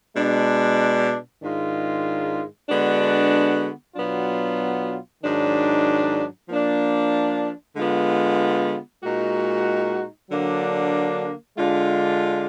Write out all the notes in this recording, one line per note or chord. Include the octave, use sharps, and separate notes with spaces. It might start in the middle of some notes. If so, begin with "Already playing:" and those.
B2 G#3 D4
G#2 D#3 G#3 D4 F4
D3 G#3 B3 D4 F#4
B2 F#3 B3 D4 F4
G#2 D#3 F#3 D4
F3 A#3 D4
D3 G#3 B3 F4
A#2 G#3 D#4 F#4
D3 F#3 A#3 D4
D3 G#3 D4 F4